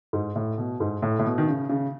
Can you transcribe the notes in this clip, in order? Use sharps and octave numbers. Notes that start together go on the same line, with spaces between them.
G#2
A2
B2
G#2
A2
A2
B2
D#3
C#3
C#3